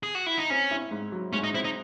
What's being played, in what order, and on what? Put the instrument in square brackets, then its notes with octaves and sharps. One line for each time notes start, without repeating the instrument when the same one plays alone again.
[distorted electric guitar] G#4
F#4
E4
D#4
[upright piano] C4 [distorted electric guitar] C#4
[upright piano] E4
G#2
F#3
[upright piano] G#2 [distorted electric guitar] C#4
[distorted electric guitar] D#4
[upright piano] C4 [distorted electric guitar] E4
[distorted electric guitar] D#4